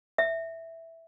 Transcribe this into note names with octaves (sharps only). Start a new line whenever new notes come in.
E5